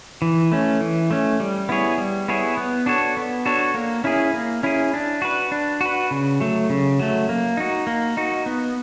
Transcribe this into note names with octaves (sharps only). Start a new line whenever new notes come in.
E3
A3 C#4
E3
A3 C#4
G3
B3 E4 G#4 C#5
G3
B3 E4 G#4 C#5
B3
D4 F#4 A4 C#5
B3
D4 F#4 A4 C#5
A#3
C#4 E4 G#4
A#3
C#4 E4 G#4
D4
F#4 B4
D4
F#4 B4
C#3
F#3 A3
C#3
F#3 A3
A#3
D#4 F#4
A#3
D#4 F#4
B3